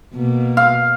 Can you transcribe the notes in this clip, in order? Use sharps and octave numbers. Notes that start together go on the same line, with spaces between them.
B2 A#3
F5